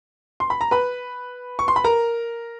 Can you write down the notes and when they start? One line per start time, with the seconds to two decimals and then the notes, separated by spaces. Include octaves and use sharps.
0.40 C6
0.50 B5
0.61 A#5
0.71 B4 B5
1.59 C#6
1.68 C6
1.76 B5
1.84 A#4 A#5